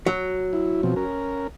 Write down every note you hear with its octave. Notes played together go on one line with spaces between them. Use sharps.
F#3
E4
B2 F3 C4
C#4 A#4